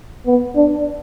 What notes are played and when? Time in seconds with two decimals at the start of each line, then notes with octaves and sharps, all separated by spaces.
0.26 B3
0.55 D4